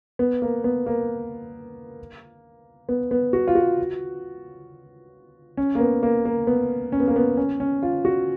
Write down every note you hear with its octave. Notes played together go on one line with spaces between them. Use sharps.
B3
A#3
B3
A#3
B3
B3
F#4
F4
F#4
C#4
A#3
B3
A#3
A#3
B3
C#4
B3
A#3
B3
C#4
C#4
F4
F#4